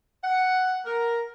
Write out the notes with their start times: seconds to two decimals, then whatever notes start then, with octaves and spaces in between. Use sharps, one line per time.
0.24 F#5
0.86 A#4